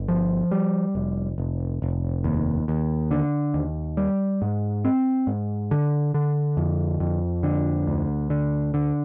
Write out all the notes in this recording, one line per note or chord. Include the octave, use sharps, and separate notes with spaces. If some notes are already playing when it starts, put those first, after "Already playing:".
Already playing: G1
F3
G3
F1
F1
F1
D#2
D#2
D3
D#2
G3
G#2
C4
G#2
D3
D3
F2
F2
D3
D2
D3
D3